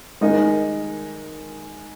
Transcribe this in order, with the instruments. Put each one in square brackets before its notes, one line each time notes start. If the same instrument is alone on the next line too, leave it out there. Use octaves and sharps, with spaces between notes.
[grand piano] D#3 G#3 D#4 A#4 D#5